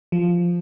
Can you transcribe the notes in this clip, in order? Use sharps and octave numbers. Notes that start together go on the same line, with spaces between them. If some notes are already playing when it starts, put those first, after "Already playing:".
F3